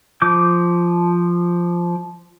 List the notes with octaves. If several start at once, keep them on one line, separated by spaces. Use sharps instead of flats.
F3 D6 G6